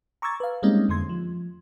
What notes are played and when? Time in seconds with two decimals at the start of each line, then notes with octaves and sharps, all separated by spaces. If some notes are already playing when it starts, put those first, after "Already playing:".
0.22 A#5 C#6 D6 E6 G#6 A6
0.40 B4 F5
0.63 G3 G#3 A#3 C4 C#4 D#4
0.89 F2 D3 A3 C6 G#6
1.09 F3